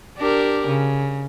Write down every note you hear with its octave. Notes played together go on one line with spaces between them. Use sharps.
D4 G4 A#4
C#3